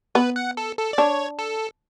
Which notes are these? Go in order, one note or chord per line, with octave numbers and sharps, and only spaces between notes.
B3 B4
F#5
A4
A4
D5
D4 C#5
A4